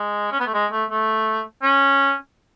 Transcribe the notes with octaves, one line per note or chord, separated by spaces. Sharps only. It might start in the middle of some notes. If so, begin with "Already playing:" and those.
Already playing: G#3
C#4
B3
A3
G#3
A3
A3
C#4